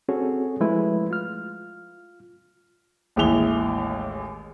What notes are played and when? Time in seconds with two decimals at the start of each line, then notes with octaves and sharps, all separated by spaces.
0.09 C4 C#4 F#4 G#4 A4 C#5
0.60 F3 G#3 A3 E4 B4
1.11 F4 F6
3.16 A1 D#2 G#3 E4 F7 G7